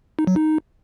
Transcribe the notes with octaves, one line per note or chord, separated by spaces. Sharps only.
D#4
F#3
D#4